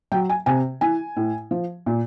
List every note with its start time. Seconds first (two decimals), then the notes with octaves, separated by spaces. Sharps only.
0.12 F#3 G5
0.29 G#5
0.46 C3 G#5
0.81 E3 G#5
1.16 A2
1.51 F3
1.86 A#2